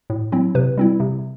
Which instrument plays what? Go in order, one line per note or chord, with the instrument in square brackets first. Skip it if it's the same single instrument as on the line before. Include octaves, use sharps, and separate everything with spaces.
[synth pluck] A2
F#3 C4 E4
C3 B4
G3 C4 E4
C3